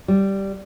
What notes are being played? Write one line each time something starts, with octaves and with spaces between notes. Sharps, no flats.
G3